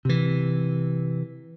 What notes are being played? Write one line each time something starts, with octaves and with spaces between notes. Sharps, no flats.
C3 E3